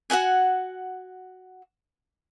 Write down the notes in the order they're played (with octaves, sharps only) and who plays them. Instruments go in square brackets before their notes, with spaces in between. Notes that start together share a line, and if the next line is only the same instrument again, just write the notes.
[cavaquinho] F#4 G#4 F#5 G#5